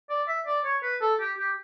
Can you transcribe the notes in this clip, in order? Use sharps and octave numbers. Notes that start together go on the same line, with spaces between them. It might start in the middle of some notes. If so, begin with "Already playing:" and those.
D5
E5
D5
C#5
B4
A4
G4
G4